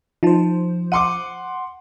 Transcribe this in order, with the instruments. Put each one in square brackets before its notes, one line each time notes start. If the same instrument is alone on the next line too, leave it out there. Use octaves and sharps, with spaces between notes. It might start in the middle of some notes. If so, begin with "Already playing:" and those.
[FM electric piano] F3 C5 [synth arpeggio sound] D#4 F4 A5
[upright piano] F#5 C6 D6 [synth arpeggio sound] C#7 D#7